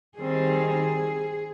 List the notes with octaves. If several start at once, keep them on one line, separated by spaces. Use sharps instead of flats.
D#3 G3 C4 D#4 G#4